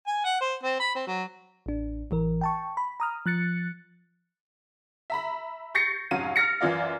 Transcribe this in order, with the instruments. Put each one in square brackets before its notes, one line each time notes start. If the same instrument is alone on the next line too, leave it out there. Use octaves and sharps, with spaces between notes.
[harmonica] G#5
F#5
C5
C4
B5
C4
F#3
[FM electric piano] A1 D4
A1 E3 A#4
G5 A5 C#6
B5
A#5 D#6 F6
F3 F#6 A6 C#7
[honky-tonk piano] E5 A#5 B5
C#6 G6 A6 A#6 C7 C#7
F1 G#2 F#3 C#4 F5 D#7
F6 A6 A#6 C#7
F#2 E3 F4 D5 F5